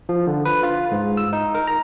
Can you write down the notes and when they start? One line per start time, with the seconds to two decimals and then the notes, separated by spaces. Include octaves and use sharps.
0.09 F3
0.27 D3
0.45 B4
0.63 F4
0.92 G#2
1.17 E6
1.33 D#4
1.55 A#4
1.67 A#5